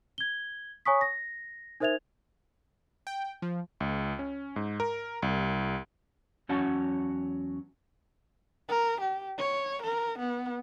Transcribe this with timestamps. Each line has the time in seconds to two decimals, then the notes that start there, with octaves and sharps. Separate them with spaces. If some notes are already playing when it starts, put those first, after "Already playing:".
0.18 G#6 G7
0.85 C#5 G#5 A#5 C#6 D#6 B6
1.01 A#6
1.80 D#4 A#4 C5 E5 G#6 F7
3.07 G5
3.42 F3
3.80 C#2
4.19 C#4
4.56 G#2
4.80 A#4
5.22 C2
6.49 E2 F#3 C#4 F#4 F#5 A5
8.69 A#4
9.01 G4
9.39 C#5
9.83 A#4
10.19 B3